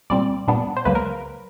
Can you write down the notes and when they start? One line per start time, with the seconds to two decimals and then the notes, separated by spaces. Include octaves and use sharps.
0.10 C2 A#2 G3 C4 D5
0.48 A#2 G3 B3 D4
0.77 C5
0.85 C#2 C#3 F#3 A#3 B4
0.95 A#4